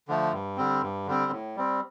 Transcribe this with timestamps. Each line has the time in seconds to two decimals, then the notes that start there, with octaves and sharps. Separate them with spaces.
0.08 D3 F3 A3
0.33 G2
0.57 D3 G3 C4
0.82 G2
1.07 D3 G3 C4
1.32 A2
1.56 G3 C4